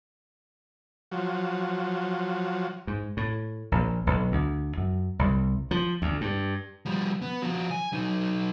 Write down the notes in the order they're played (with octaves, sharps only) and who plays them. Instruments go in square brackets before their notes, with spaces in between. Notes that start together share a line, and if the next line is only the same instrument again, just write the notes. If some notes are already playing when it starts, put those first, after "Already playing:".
[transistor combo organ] F3 F#3
[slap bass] G#2
A2
A#1
B1
D2
F#2
C2
F3
D2
G2
[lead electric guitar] F3 G3
B3
F3 F#4
G#5
F#3 D#4